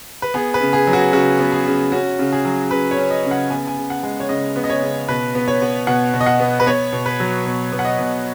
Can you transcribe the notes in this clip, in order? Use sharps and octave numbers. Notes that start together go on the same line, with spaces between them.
B4
B3 G#4
B4
C#3
G#4
F#3
F#4
C#3 F#4
B3
G#4
C#3
C#4 F#4
C#3
G#4
F#3
C#3 B4
C#5
C#4
D#5
C#3
F#5
B3 G#5
G#5
C#3
F#5
G#3
C#5
C#3 D#5
B3
D#5
C#5
C#3
B2 B4
B3
C#5
B3
B2 F#5
B2
D#5
F#5
B3
B4
B3 C#5
B2
B4
F#3
B2
B3
F#5
D#5
B2